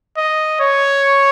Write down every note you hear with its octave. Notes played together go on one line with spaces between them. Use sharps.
D#5
C#5